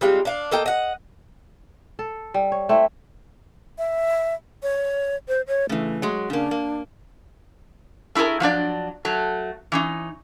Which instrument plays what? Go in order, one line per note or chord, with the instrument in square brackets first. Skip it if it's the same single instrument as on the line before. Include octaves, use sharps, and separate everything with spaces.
[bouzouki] G3 G#3 C4 F4
D4 F5
A#3 A4 D#5 G5
D#5 F#5
[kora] A4
G3
C#5
[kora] A3 C4 E4 [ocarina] E5
[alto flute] E5
C#5
[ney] C5
C#5
[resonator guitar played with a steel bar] C#3 E3 [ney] A3
[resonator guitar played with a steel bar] F#3 G#3
[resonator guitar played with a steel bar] C#3 A#3 [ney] D4
[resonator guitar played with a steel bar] A#3
A3 E4 F#4 G#4 A#4
F3 F#3 D4 D5
F#3 A3
E3 C#4 D#4